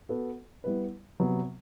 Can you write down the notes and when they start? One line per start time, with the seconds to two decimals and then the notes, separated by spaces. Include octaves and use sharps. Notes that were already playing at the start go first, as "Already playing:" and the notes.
0.09 B3 F#4 A4
0.64 G3 B3 E4 B4
1.20 C3 F#3 B3